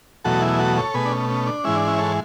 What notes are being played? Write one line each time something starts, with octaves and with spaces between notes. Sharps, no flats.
E2 B2 F#3 A3 F#4 A4
E4 G#4
G#4
F#4 A4
A4 C#5
B2 A3 G#4 B4
D4
C#4
C#4
D4
G#2 E3 G#3 C#4 E4
D4
C#4 E4
A4 C#5